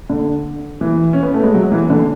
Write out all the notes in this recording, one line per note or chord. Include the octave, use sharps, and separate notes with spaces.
D3
E3
C#4
B3
A3
G#3
F#3
E3
D3